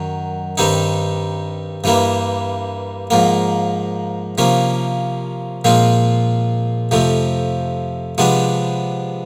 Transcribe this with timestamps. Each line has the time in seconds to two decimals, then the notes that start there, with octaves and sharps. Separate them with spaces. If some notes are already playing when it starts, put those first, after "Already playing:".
Already playing: F#2 D#3 F#3
0.58 G2 D#3 G3 C4 D#4
1.84 G2 E3 G3 A#3
3.10 G#2 F3 A#3
4.38 C3 F3 A#3 C#4
5.65 A#2 F3 G#3 C4 F4
6.91 F2 C3 F3 A3
8.18 C3 F3 G#3 B3 D4